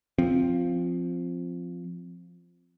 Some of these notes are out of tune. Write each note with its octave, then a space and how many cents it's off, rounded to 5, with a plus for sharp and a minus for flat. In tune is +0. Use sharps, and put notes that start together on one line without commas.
F3 +0 C4 +0